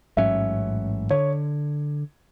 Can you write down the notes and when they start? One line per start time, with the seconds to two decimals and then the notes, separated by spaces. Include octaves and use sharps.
0.17 A1 G#2 F#3 C#4 E5
1.10 D3 C#5